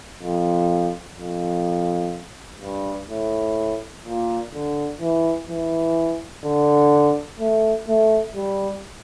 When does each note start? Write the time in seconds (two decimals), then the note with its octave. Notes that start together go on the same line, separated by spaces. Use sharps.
0.23 F2
1.18 F2
2.61 G2
3.09 A2
4.05 A#2
4.53 D3
5.01 E3
5.49 E3
6.45 D3
7.39 A3
7.88 A3
8.35 G3